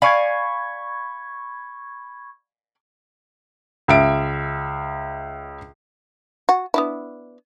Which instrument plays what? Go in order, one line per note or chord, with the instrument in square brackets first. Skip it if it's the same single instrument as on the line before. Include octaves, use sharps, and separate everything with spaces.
[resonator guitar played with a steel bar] D5 F5 G#5 [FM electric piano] B5 C#6 G#6
[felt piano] C#2 E5 D7
[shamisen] F#4
B3 D4 E4